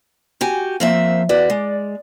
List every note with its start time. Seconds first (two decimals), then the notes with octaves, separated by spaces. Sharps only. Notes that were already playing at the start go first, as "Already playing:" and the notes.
0.41 F#4 G4 G#5
0.80 F3 A#3 C4 E5
1.29 E2 F#4 B4 D5
1.50 G#3